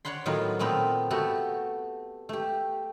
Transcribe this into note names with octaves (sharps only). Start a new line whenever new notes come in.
C#5 D5 F#5 B5 C6
A2 D#3 F#3 B3 F4
A#2 A3 B3 C4 A#4 B5
A3 B3 F#4 G4 A4
A3 G4